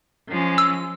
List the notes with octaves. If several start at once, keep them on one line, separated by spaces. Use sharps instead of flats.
F3 G#3 C#4
E6